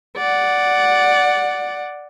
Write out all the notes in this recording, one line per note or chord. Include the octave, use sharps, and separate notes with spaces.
D5 F#5